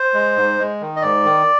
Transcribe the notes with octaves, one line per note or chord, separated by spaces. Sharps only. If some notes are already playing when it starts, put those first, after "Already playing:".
Already playing: C5
G#3
G#2
G#3
D#3
D#5
G#2 D5
D#3